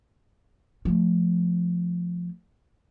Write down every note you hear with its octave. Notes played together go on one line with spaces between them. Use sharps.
F3 A3